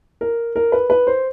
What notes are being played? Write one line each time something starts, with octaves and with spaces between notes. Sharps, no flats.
A#4
A#4
B4
B4
C5